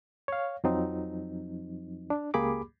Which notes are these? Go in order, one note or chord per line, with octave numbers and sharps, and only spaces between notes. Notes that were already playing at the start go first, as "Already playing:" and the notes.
C#5 F5
F2 F3 F#3 C4 D#4
D4
C#2 A#3 G4 G#4 B5 D6